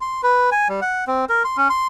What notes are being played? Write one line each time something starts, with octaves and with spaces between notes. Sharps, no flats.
C6
B4
G#5
G3
F#5
C4
A#4
C6
C#4
C6